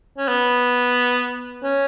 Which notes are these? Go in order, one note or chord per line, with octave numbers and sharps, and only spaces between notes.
C#4
B3
C#4